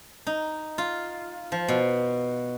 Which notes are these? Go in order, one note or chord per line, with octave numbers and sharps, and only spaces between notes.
D#4
F4
F3
B2